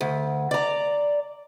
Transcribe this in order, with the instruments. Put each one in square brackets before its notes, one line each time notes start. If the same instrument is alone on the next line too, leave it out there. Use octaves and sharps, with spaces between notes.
[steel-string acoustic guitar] D2
D5 A#5